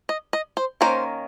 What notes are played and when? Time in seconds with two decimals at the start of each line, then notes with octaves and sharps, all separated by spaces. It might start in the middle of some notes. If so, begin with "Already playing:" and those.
0.09 D#5
0.33 D#5
0.57 C5
0.81 D#3 A#3 C#4 C5